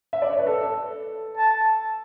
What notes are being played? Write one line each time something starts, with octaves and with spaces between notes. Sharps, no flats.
E5
D5
C#5
B4
A4
A5